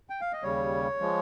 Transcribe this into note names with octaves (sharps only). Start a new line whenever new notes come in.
G5
F5
D#5
D#2 C#3 G3 C#5
F3 G#3